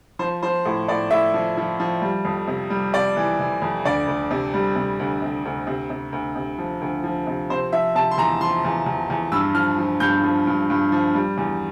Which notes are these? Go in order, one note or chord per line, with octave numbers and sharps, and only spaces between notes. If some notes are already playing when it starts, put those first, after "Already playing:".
F3 C5
F3 C5
A2
A2 D5
A2 E5
F3
F3
F3
G3
F2
C3
G3
C3 D5
E3
E3
F2
D2 D5
D2
C3
G3
C3
D2
C3
D2
C3
C3
D2
C3
F3
D2
F3
C3
C3 C5
F3 E5
C3 A5
C6
E2 A#5
F3 C6
E2
E2
E2
G2 E6
F3 F6
F3
G2 G6
F3
G2
G2
F3
G3
E2